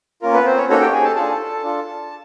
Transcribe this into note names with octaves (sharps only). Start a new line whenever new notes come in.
A#3 C#4 F4 A#4
B3 B4
C4 C5
C#4 C#5
A#3 C#4 D#4 F#4 A4 C#5
G4 G5
G#4 G#5
A4 A5
D4 F4 G#4 A4 A5
D4 F4 A4